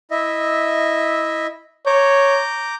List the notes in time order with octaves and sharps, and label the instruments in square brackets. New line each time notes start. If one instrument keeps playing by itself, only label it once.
[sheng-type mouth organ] E4 D#5 E5
[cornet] C#5 [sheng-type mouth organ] A#5 D6 G6